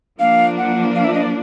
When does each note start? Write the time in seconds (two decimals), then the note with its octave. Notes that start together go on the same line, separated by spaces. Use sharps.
0.20 F3 A#3 D4 F5
0.57 F#5
0.95 F5
1.04 E5
1.14 D#5
1.23 D5